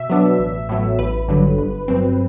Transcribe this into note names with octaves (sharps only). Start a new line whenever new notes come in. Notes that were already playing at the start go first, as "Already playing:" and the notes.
Already playing: B2 E5
F#3 B3 D4
A1
A2 F#3 B3
A1 B4
G2 D3 F#3
G1
G2 F#3 C4